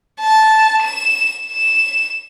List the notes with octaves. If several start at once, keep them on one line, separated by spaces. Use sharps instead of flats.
A5
E7
E7